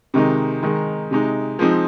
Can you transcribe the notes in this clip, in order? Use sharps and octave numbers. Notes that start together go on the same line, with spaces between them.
C3 D#3 G#3 D#4
D#3 G#3 D#4
C3 G#3 D#4
F3 G#3 C4 D#4